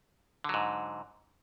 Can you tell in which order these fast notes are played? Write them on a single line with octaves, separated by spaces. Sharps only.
D3 F#3 G#2